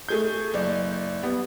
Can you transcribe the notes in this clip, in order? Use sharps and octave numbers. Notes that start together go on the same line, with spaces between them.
A3 G#4 G6
F#1 D5
G3 B3